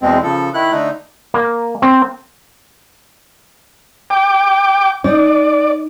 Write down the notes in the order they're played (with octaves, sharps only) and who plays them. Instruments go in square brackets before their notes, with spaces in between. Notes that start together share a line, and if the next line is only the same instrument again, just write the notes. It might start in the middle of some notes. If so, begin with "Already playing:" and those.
[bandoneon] E2 B2 G#3 C4
C#3 F3 A4
D#3 E4 F#6
D3 A3 D#4
[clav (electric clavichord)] A#3
C4
[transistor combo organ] G5 D6
[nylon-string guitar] D#4 [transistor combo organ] D5